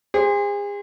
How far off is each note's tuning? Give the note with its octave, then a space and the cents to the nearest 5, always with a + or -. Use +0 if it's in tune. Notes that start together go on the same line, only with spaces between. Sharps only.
G#4 -40 C5 +0